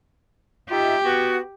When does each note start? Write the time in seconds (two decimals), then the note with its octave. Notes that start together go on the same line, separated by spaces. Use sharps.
0.70 D#4 F4 G4 E5
1.05 B3 F#4